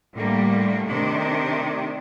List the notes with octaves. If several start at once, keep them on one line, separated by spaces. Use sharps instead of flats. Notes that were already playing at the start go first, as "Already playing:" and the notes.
A2 D3 G3 A#3
C3 D#3 A3 D4